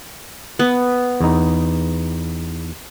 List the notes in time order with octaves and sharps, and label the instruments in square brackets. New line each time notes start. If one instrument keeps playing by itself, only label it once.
[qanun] B3
[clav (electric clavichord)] E2 D#4